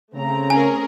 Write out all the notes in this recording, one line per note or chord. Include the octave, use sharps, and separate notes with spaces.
C#3 A3 C4 A#5
C#4 G#4 A#4 G#5